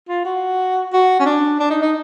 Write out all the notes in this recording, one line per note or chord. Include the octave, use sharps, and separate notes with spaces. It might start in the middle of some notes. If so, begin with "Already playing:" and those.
F4
F#4
F#4
C#4
D4
D4
D#4
D#4